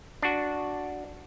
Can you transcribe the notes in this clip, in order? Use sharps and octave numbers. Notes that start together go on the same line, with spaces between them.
D4 F#4